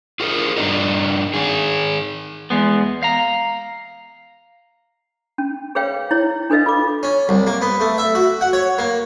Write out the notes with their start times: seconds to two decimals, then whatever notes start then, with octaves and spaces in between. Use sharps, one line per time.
0.20 F4 G#4 A#4
0.57 G2 C3 D4 D#4 A#4
1.34 D#3 G#4
2.50 E2 G#3 B3
3.03 F5 A#5
5.38 C#4
5.75 G#4 B4 C#5 F5 G5
6.11 E4 C#5
6.50 D4 A4 B4 D#5 F5
6.66 F4 A4 D6
7.03 C#4
7.29 C2
7.47 A#3
7.61 B3
7.80 A3
7.98 E5
8.15 F#4
8.41 F#5
8.53 C#5
8.78 A#3